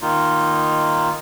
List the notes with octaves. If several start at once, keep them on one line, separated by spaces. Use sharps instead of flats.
D#3 A#3 D#4 F4